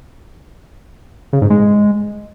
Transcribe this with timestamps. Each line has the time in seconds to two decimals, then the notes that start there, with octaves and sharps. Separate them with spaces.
1.33 C#3
1.41 G#2
1.50 G#3